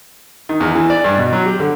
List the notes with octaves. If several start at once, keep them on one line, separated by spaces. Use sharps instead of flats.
D#3
E2
E3
D5
G2
B2
F#3
G4
D3